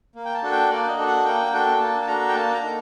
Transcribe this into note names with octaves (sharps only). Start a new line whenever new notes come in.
A#3
G5
A5
D4 F#4 A4
G5
A#3 D5
D#5
D4 F#4 A4
F#5
A#3 G5
D4 F#4 A4 G5
A#3 A5
A5
D4 F#4 A4 A#5
G5
A#3 A5
A#5
D#4 A4